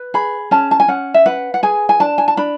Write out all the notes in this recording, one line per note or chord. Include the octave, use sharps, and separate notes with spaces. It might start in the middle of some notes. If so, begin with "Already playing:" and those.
Already playing: B4
G#4 B5
C#4 A5
A5
G#5
C#4 F#5
E5
B4 F#5
F#5
G#4 G#5
G#5
D4 A5
G#5
A5
D4 B5